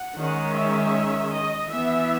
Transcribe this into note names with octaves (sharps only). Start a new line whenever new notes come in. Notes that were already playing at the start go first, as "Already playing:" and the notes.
Already playing: F#5
D#3 G#3 C#4
E5
D#5
E3 B3 E5